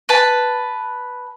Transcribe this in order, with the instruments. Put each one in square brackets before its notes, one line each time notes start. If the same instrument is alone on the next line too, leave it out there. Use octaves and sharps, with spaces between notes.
[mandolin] B4 A5